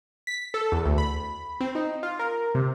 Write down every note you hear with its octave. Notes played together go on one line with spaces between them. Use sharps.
B6
A4
E2
D2
B5
C4
D#4
F4
A#4
C3